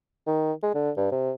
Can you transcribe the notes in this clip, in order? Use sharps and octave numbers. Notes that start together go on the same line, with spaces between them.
D#3
G#3
D3
G2
C3